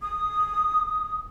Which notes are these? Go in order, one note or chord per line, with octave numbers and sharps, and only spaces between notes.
D#6